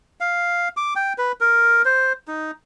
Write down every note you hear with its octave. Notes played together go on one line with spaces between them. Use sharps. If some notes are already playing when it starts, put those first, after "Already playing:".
F5
D6
G5
B4
A#4
C5
D#4